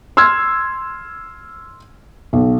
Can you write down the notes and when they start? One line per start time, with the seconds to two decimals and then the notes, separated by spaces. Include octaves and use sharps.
0.17 C6 E6 F6 G#6
2.33 B1